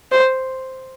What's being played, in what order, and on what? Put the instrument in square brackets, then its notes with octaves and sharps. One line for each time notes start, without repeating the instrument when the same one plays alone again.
[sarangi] C5